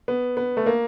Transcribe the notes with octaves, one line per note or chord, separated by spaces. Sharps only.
B3
B3
A3
A#3